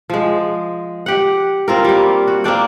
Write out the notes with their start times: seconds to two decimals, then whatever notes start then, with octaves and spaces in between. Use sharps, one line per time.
0.10 F3 G#3
1.06 G4 F#5
1.68 C4 F4 A#4
1.85 G3 A#3
2.27 F#4
2.44 A#3 C4 D4 G5